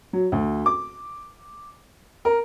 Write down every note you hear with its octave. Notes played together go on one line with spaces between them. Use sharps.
F#3
D2
D6
A#4